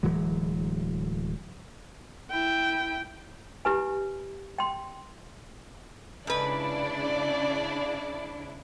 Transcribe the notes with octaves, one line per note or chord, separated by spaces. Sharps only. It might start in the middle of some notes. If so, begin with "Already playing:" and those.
D1 E3 F#3 G#3
E4 G5
E4 G4 B4 G#5
G5 C6
G#2 C#3 D4 E4 B4 D5